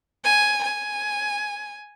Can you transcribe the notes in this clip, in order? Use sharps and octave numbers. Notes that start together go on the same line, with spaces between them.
G#5
G#5